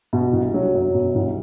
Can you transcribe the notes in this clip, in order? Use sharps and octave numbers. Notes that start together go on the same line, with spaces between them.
B2
C2
F#3
F#2
B2
C2